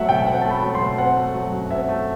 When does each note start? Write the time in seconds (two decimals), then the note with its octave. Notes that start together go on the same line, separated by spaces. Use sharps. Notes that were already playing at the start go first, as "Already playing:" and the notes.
Already playing: F#3 A3 C4 E5 F#5
0.09 B2 G5
0.27 C4 F#5
0.41 A3 A5
0.50 B5
0.63 F#3
0.75 C6
0.80 B2
0.98 C4 F#5
1.17 A3
1.34 F#3
1.52 F#2
1.70 C4 E5
1.89 A3